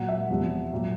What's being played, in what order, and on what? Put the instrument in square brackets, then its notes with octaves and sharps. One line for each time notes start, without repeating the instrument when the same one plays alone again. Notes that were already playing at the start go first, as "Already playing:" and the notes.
Already playing: [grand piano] A#2 F#3 F#5
E5
E2 C3 F3
A#2 F#3